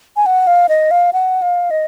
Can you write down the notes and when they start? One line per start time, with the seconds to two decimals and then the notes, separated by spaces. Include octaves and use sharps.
0.16 G#5
0.26 F#5
0.47 F5
0.69 D#5
0.91 F5
1.13 F#5
1.42 F5
1.71 D#5